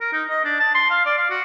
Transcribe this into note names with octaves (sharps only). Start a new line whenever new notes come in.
A#4
D#4
D#5
D4
A5
C6
F5
D5
F5
F#4